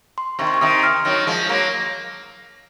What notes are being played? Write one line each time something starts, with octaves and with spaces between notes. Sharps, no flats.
C6
C3 D#3 C#6
C6
C#6
C3 D#3 D#6
F6
D#3 F#3
F3 G#3
F#3 A#3